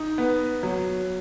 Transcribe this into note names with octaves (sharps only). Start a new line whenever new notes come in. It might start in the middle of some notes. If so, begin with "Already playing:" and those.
Already playing: D#4
B3
F#3